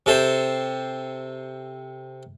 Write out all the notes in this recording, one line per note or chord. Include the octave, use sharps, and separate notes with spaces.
C3 A4 C5